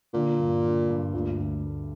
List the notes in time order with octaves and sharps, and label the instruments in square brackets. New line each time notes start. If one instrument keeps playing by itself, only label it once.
[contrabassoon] A#2 [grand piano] D3
[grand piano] G2
D3
G2
[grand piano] D2 [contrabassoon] A#2
[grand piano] D2
A3